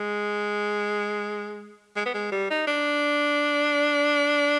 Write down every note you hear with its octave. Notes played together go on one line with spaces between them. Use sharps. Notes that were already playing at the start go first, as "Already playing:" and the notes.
Already playing: G#3
G#3
B3
G#3
G3
D#4
D4